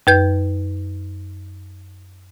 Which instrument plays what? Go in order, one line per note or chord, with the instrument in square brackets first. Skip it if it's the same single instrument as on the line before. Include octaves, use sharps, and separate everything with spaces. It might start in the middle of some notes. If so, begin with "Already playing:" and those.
[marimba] F#2 B4 G6